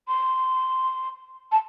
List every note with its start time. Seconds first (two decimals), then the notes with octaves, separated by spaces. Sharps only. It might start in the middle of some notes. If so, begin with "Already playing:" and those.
0.08 C6
1.52 A5